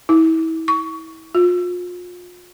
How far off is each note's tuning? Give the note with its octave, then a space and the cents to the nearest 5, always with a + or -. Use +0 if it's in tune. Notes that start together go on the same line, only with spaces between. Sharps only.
E4 -35
C#6 +25
F4 +35